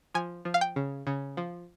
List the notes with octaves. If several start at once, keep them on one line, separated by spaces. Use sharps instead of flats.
F3 G#5
F3
F5
G5
C#3
C#3
F3